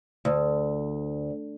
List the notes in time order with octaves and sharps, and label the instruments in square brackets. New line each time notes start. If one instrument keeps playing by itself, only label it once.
[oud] D2